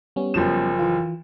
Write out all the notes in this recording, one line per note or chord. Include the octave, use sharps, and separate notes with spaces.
G3 B3 C#4
F#1 F3 E7
E3 F4